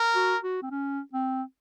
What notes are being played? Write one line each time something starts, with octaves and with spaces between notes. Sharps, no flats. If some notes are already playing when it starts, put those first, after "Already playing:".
Already playing: A#4
F#4
F#4
C4
C#4
C4